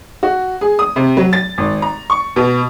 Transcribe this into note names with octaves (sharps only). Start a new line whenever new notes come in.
F#4
G#4
D#6
C3
F#3
A6
G#1
A#5
C#6
B2